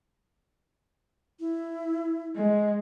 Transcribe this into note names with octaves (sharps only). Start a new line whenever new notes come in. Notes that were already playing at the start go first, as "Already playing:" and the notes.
E4
G#3